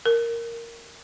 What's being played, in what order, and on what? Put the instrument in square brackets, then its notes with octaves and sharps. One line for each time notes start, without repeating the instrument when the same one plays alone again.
[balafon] A#4